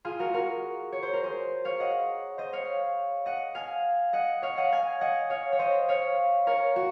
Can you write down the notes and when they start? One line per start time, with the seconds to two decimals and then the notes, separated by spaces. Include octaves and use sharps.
0.05 F4 G#4
0.19 F#4 A#4
0.34 F#4 A#4
0.92 C#5
1.03 C5
1.13 A#4
1.23 G#4 C5
1.65 C#5 F5
1.80 D#5 F#5
2.38 C5 D#5
2.53 C#5 F5
3.26 D#5 F#5
3.55 F5 G#5
4.13 D#5 F#5
4.42 C#5 F5
4.57 D#5 F#5
4.72 F5 G#5
5.01 D#5 F#5
5.30 C#5 F5
5.52 C#5
5.59 C5 D#5
5.88 C#5 F5
6.47 A#4 C#5
6.76 F#4